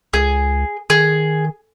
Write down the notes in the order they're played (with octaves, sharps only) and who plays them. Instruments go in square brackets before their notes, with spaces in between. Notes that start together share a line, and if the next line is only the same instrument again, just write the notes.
[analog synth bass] C#2 [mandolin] G#4
[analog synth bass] D#3 [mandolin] G#4